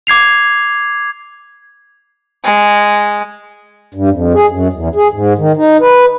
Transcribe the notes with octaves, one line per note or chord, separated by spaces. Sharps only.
D6 G#6 C7 F7
G#3
G2
F2
G#4
F#2
E2
G#4
G#2
D#3
D#4
B4